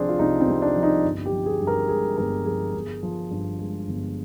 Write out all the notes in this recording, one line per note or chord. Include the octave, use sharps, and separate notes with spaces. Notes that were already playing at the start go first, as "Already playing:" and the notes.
Already playing: C2 C3 F3 C4 D4 G#4
F4
C2 D#4
C4
C2
D4
F3
D#4
G1
G4
F3
G#4
G2
A#4
G#3 G#4
G1 A#4
F3 G#4
G1
F3
G2
G#3
G1